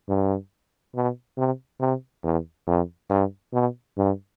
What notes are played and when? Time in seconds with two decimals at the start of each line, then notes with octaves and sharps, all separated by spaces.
0.09 G2
0.95 B2
1.38 C3
1.81 C3
2.24 E2
2.67 F2
3.10 G2
3.53 B2
3.97 G2